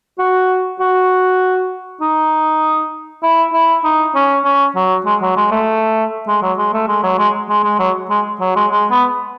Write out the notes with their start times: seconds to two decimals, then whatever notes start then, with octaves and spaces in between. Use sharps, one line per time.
0.19 F#4
0.80 F#4
2.01 D#4
3.23 E4
3.54 E4
3.84 D#4
4.15 C#4
4.45 C#4
4.76 F#3
5.06 G#3
5.22 F#3
5.36 G#3
5.51 A3
6.28 G#3
6.42 F#3
6.58 G#3
6.73 A3
6.88 G#3
7.03 F#3
7.18 G#3
7.49 G#3
7.64 G#3
7.79 F#3
8.10 G#3
8.40 F#3
8.56 G#3
8.71 G#3
8.91 B3